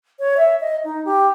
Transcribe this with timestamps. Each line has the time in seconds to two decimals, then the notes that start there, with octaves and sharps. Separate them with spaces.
0.19 C#5
0.37 E5
0.60 D#5
0.84 D#4
1.05 G4